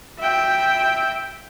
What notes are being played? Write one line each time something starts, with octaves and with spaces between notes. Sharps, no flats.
E5 G5